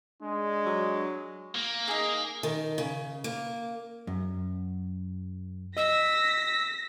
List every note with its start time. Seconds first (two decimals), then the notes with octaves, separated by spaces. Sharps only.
0.22 G#3 D4
0.66 F#3
1.55 A#3
1.88 D#4 G#4
2.43 D#3
2.78 C#3
3.24 A#3
4.07 F#2
5.77 D#5 E6 A#6 B6